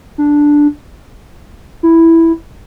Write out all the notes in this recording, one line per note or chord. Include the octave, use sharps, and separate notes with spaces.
D4
E4